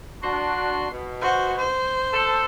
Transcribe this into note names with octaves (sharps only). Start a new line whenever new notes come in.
D4 F#4 C6
B2
F#4 C5
C5
A4